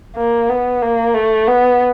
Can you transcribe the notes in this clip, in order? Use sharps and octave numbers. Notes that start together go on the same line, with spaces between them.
A#3
B3
A#3
A3
B3